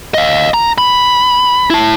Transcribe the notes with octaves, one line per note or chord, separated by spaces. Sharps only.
D#5 F5
A#5
B5
E4 A5